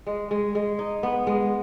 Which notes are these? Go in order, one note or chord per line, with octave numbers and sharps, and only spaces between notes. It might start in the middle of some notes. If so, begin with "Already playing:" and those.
G#3
G#3
G#3
D#4
B3
G#3